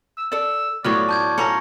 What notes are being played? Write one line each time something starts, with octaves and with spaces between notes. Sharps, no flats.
E6
A4 D5 E6
A2 F#3 B3 F4 C#5 D5 C#6 F6
A5 G6 G#6
C#4 F4 A4 A#5 A#6 C#7